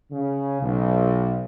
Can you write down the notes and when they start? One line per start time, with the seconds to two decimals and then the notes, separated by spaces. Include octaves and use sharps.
0.11 C#3
0.62 B1